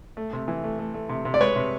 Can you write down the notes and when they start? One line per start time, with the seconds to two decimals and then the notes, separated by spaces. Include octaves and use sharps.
0.17 A3
0.33 C3
0.48 E3
0.64 A3
0.79 A3
0.94 A3
1.09 C3
1.25 C3
1.34 D5
1.41 G#3 B4 C#5
1.56 C3